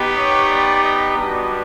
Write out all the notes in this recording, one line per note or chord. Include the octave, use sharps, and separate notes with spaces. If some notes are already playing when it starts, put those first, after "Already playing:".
Already playing: B3 D#4 G4
C#5
D5
D#5
G3 B3 D4 F#4